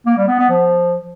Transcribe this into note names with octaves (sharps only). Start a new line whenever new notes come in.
A#3
G3
B3
B3
F3